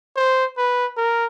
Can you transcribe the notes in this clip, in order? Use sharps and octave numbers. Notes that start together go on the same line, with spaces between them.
C5
B4
A#4